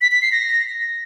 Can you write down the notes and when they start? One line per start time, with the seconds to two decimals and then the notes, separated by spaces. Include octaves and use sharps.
0.01 B6
0.12 B6
0.22 C7
0.32 A#6